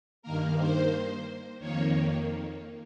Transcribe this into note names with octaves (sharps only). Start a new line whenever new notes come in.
G2 D#3 A#3 A#4
C5
F2 D#3 A#3 C#5